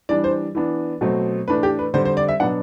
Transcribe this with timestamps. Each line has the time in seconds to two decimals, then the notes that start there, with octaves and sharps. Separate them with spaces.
0.09 E3 G3 D4 D5
0.24 C5
0.55 E3 B3 D4
1.01 B2 F#3 A3 C4
1.48 A2 E3 A3 D4 B4
1.63 G4
1.79 B4
1.94 D3 G3 C4 C5
2.05 C5
2.17 D5
2.28 E5
2.40 B2 F#3 B3 D4 F#5